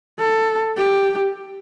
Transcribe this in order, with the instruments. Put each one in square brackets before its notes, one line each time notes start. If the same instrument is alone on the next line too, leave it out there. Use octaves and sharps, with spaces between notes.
[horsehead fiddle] A4
G4